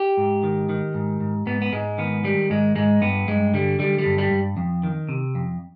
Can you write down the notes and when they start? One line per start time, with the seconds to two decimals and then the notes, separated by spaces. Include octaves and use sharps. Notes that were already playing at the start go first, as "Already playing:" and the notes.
Already playing: G4
0.17 G#2
0.43 D#3
0.69 D#3
0.94 G#2
1.20 G#2
1.46 G#2 B3
1.62 B3
1.72 G#2 G#3
1.98 D#3 B3
2.24 D#3 G3
2.50 G#2 G#3
2.76 G#2 G#3
3.01 G2 B3
3.28 G2 G#3
3.54 D3 G3
3.79 D3 G3
3.99 G3
4.05 G2
4.18 G3
4.31 G2
4.57 F2
4.83 D#3
5.09 C3
5.35 F2